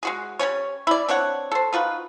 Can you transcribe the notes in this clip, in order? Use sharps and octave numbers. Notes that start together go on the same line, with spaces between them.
G#3 F#4 G#4
G3 C4 C#4 C#5
E4 D5
C4 D4 C#5 F#5
A4 C5
D#4 F4 F#4 B4